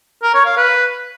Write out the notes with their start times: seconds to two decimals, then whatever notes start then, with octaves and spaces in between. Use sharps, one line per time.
0.23 A#4
0.34 C#5
0.46 F5
0.57 B4